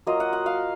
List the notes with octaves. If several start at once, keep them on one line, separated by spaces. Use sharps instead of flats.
F#3 A#3 F4 D#5
F#5
F#5
F5